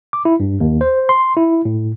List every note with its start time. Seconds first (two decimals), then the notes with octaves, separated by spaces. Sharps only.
0.13 D6
0.25 E4
0.40 G2
0.60 D#2
0.81 C5
1.09 C6
1.37 E4
1.65 A2